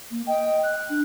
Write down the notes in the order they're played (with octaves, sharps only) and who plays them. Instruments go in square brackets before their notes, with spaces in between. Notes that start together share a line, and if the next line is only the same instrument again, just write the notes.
[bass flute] A#3
[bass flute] D#5 [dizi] G5
[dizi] F#6
[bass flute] D4